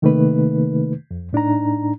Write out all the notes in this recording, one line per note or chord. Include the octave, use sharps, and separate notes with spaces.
C3 D#3 A3 A#3 D#4 B4
F2
A2 D4 D#4 A#5